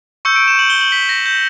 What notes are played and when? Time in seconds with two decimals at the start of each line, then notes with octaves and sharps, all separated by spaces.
0.25 C#6 E6 G6 C#7
0.36 D7
0.48 E7
0.59 F#7
0.70 G7
0.81 F#7
0.92 B6
1.09 A#6
1.26 G6